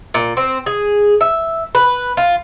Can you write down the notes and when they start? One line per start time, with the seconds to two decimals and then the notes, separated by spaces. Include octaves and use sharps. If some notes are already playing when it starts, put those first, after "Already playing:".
0.14 A#2
0.37 C4
0.66 G#4
1.21 E5
1.75 B4
2.17 F4